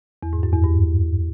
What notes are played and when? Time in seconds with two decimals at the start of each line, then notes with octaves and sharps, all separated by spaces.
0.23 E2
0.33 G#2
0.43 F#2
0.54 E2
0.64 G2